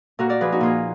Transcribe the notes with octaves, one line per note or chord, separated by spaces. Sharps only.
A#2 F#4 A#4
A#4 D5
F3 G#4 B4
D#4 F#4
A#2 F4 G#4